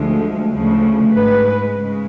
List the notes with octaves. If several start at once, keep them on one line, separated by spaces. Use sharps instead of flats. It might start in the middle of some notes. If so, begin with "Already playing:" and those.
Already playing: D2 D3 F3 G#3
D2 C#3 F3 A3
G#2 G#3 B4
C#3 G#3